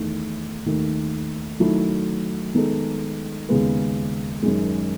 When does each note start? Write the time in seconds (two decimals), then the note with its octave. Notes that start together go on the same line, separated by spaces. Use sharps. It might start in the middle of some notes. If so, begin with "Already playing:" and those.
Already playing: E2 D#3 A3
0.66 D#2 D#3 A3
1.60 D#3 F#3 A3 E4 A4
2.55 D#3 G#3 B3 D#4 A4
3.49 D#2 C#3 G#3 B3
4.42 F#2 D#3 G#3